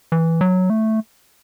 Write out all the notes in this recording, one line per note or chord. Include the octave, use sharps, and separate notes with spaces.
E3
F#3
A3